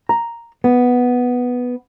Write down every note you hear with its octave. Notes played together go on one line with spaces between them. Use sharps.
A#5
B3